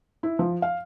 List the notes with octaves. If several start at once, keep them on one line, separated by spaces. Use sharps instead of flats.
E4
F3
F5